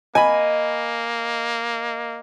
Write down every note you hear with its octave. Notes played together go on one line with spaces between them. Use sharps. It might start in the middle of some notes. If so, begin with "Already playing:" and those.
A#3 D#5 G#5 B5